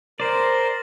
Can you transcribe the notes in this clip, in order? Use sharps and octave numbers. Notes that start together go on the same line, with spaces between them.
A#4 C5 D5